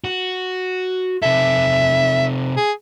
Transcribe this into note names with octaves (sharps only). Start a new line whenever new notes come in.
F#4
C3 A4 E5
G#4